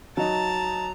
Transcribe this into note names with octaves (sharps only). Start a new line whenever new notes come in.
F#3 D#4 A5 A#5